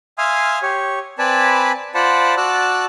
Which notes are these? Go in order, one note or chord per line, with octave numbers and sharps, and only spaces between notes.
E5 F5 G#5 C6 D#6 F6
G4 C#5
C4 B4 D5 G#5 A5 B5
F4 C5 D5 F#5 A5 B5
F#4 D5 A5 E6 F#6